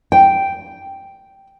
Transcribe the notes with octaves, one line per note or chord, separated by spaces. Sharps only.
G5